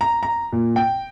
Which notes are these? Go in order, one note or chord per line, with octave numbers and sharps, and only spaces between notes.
A#5
A#5
A#2
G5